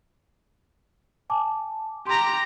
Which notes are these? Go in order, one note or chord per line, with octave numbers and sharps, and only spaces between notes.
G#5 A5 D6
G4 A#5 C6